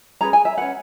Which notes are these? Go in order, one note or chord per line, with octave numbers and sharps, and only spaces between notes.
C#4 G#4 B4 A#5
G#5
E5
C#4 G#4 B4 F#5